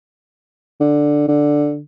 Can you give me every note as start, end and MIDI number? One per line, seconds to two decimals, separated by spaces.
0.80 1.27 50
1.28 1.81 50